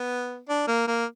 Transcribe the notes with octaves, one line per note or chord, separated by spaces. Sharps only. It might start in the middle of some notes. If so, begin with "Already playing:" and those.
Already playing: B3
D4
A#3
A#3